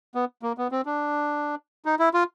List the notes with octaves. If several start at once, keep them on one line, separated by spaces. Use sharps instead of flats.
B3
A#3
B3
C4
D4
D#4
E4
F4